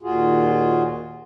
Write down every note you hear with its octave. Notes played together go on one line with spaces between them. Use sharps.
D#2 A#2 F4 F#4 G#4